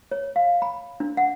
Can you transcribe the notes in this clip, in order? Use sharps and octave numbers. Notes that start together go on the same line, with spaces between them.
C#5
F5
B5
D4
F#5